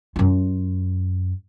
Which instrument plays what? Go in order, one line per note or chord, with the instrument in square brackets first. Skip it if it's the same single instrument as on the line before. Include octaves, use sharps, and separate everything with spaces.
[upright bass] F#2 F4